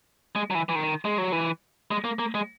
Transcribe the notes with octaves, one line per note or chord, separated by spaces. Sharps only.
G#3
F#3
E3
E3
D#3
G#3
F#3
E3
G#3
A#3
A#3
G#3